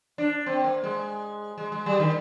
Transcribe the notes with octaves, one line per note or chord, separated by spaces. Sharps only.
D4
C4
A#3
G#3
G#3
G#3
G3
D#3